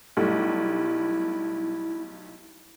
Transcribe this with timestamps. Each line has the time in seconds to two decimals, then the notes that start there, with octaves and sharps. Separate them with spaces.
0.17 B1 G3 A3 E4